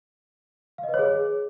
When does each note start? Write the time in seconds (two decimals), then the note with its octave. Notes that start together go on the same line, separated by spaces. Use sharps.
0.78 F5
0.83 D#5
0.89 B4
0.94 C#5
0.99 G#4